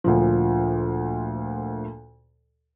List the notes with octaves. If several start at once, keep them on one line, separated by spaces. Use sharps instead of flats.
D2 A#2 F3